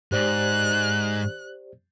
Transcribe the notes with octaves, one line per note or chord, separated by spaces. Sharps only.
G#2 G4 C5 D5 F#6